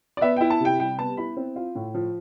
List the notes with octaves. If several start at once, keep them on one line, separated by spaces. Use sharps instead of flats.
D5
B3 E5
E4 G5
A5
C3
G5
G3 G5
B3 A5
E4 B5
C4
F4
A2
F3